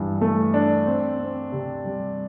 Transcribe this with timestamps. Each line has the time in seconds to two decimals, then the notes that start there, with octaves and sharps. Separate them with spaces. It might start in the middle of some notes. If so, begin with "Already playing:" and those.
Already playing: G2 E3
0.21 A3
0.54 D4
0.87 C4
1.20 C4
1.52 C3
1.85 G3